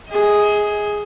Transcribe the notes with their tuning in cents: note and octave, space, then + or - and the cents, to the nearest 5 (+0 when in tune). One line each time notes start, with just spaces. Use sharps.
G#4 +0 D#5 +40